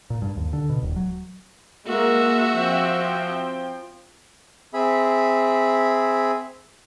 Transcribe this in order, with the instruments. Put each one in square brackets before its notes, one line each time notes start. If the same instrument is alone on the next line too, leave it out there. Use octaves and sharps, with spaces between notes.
[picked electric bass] A#2
G2
D#2
D3
B2
D#1
F#3
[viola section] G#3 A#3 A#4 [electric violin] F#4 E5
[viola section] F3 C4 G5
[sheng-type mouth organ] C4 G#4 E5 B5